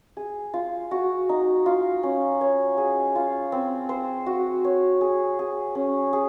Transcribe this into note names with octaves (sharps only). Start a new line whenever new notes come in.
G#4
F4
F#4
D#4
F4
C#4
C#5
G#4
F4
C4
C5
F#4
C#5
G#4
G#4
C#4
G#4